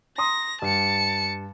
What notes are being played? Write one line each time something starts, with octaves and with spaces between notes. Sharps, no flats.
A#5 C6 D#6 A#6
G2 A5 C#7